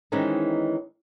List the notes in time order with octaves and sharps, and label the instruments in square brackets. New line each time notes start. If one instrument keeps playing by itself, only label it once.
[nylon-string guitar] D#3 E3 G#3 C4 C#4 D#4